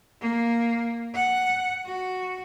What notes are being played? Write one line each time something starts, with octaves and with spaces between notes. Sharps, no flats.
A#3
F#5
F#4